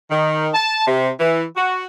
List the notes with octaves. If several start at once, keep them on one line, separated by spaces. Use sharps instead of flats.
D#3
A5
C3
E3
F#4